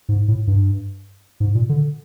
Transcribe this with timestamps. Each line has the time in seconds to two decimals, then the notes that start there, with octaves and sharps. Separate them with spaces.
0.09 G#2
0.28 A2
0.47 G2
1.40 G#2
1.55 A#2
1.69 D3